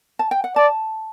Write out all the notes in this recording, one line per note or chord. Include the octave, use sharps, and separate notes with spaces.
A5
G5
F#5
D5 A5